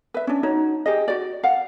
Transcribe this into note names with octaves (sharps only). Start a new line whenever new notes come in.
B4 E5
C#4 D4
D#4 F#4 C#5
G4 G#4 D#5
F#4 D5
F5 F#5